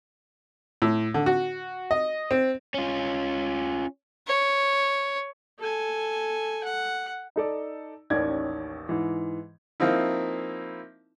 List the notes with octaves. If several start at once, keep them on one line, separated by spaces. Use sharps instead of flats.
A2
D3
F#4
D#5
C4
C#4 F4
C#5
A4 G#5
F#5
D#4 A4 D5
A1 D#2 D#3 C#4 D5 G#6
G#2 E3
F3 A#3 C4 D#4 E4